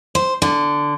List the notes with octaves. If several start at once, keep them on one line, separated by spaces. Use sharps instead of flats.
C5
D3